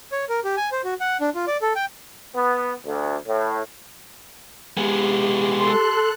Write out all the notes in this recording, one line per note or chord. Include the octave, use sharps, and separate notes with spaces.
C#5
A#4
G4
G#5
C5
F#4
F#5
D4
F4
D5
A4
G5
B3
D2
A2
G#3 B3 G4
A4 C6 F#6